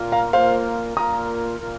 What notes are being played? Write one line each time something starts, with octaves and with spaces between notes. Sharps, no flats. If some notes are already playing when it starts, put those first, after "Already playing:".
Already playing: A#2 A#3 F4 A#4
F5 A#5
A#2 A#3 F4 A#4 C5 F5
A#2 A#3 F4 A#4 A#5 D#6
A#2 A#3 F4 A#4